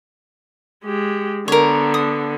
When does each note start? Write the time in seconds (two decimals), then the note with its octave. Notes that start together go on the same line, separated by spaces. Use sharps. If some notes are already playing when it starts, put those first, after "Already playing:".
0.84 G#3 G4
1.48 D3 B3 A#4 C#5
1.94 D#6